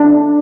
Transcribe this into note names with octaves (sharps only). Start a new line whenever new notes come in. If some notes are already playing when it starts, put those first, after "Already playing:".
Already playing: D4